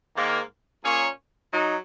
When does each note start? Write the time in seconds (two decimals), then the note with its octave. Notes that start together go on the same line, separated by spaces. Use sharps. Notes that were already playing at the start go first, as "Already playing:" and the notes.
0.16 G#2 D#3 A#3
0.84 A#2 A#3 C#4 G#4 C#5
1.53 F#3 D#4